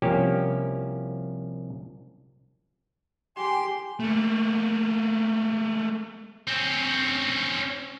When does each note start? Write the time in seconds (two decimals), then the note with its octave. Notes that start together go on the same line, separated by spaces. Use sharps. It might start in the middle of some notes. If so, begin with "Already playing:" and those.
0.02 C2 F3 A#3 C#4 G4 F5
3.37 G4 G#5 C6
4.00 A3 A#3
6.48 C4 C#4